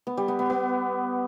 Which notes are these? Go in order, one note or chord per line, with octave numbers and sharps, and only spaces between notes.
B3
G3
B3
B3
B3